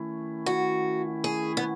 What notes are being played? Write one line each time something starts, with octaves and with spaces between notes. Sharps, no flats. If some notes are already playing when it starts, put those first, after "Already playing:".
Already playing: D#3 A3 C#4 E4
F#4
G#4
B3